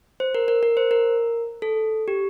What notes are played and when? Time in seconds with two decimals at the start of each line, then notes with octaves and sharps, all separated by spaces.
0.20 C5
0.35 A#4
0.48 A#4
0.63 A#4
0.77 C5
0.91 A#4
1.62 A4
2.08 G4